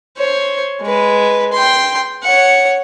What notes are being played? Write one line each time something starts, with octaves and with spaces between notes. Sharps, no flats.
C5 C#5
G#3 B4
G5 C6
C#5 F#5